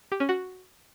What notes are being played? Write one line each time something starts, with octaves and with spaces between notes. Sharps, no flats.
G4
C#4
F#4